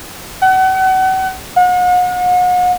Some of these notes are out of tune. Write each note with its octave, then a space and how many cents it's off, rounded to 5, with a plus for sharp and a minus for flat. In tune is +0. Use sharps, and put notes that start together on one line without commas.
F#5 +35
F#5 -40